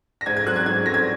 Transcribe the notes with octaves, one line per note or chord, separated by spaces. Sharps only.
A#6
G#2 G#6
G#6
F#3 C4 F#6
G#6
G#2 G#6
F#3 C4 A#6
G#6